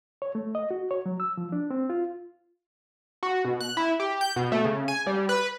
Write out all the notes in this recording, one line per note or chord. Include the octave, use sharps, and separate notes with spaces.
C#5
A3
D#5
F#4
C#5
F#3
E6
F3
D4
C4
F4
F#4
B2
F#6
E4
G4
G6
B2
A3
C#3
G#5
G3
B4